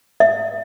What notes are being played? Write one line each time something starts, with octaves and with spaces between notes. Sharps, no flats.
E5